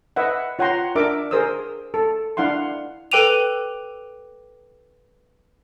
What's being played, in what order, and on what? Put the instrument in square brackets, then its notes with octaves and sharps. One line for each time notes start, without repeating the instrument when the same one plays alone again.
[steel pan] B4 D#5 E5 F#5
F4 C#5 F#5 G5 A#5 C6
D4 A#4 E5 D6
G#4 A#4 C5 D#6 E6
A4
D4 E4 F5 F#5 C6
[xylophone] A4 B4 G5 D6 D#7 F7